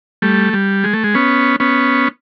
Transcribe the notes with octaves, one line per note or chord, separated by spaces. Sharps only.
G3 A3
G3
G#3
A3
G#3
B3 C#4
B3 C#4